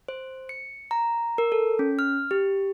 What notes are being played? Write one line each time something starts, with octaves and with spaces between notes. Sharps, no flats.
C5
C#7
A#5
A#4
A4
C#4
F6
G4